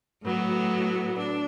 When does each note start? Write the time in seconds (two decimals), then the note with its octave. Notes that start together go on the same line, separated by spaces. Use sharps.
0.22 A2 F#3 B3
1.18 D4